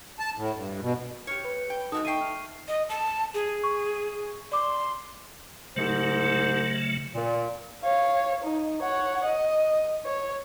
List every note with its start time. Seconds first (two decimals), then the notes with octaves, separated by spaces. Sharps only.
0.19 A5
0.36 A2
0.55 G2
0.82 B2
1.27 G4 C#5 F6 C#7
1.45 B4
1.70 G5
1.92 G#2 D#4 F#4 A4 D#6
2.05 A3 G5 C#6 C7 D#7
2.21 F6
2.68 D#5
2.89 A5
3.34 G#4
3.63 C#6
4.52 D5 C6 D6
5.76 C2 G#2 C#3 F#3 A3 C5
7.15 A#2
7.82 C#5 F5
8.44 D#4
8.82 C#5 F#5
9.24 D#5
10.05 C#5